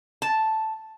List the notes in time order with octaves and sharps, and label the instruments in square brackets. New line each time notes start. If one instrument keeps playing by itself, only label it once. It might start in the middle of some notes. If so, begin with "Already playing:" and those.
[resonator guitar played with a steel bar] A5